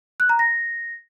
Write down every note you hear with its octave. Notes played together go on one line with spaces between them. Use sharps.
F#6
A#5
A#6